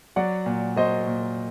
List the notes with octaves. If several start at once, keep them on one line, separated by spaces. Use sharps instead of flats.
F#3 D5 F#5
A#2
F#3 C5 D#5
A#2